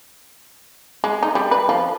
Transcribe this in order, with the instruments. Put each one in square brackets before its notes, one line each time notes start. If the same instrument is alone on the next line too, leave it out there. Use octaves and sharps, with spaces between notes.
[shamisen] G#3
D#4
G3
B4
F3